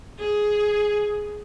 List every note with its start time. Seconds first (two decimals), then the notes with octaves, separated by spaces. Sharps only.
0.20 G#4